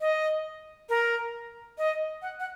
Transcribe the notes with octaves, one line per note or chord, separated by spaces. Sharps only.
D#5
A#4
D#5
F#5
F#5